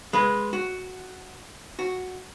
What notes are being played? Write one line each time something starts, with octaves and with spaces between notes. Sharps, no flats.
G#3 B4
F#4
F#4